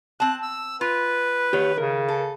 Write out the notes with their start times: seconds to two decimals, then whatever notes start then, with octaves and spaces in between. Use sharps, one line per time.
0.20 C4 A5 F#6
0.43 E6
0.81 F4 B4
1.53 D#3 G4 C#5
1.78 C#3 A#4
2.08 A4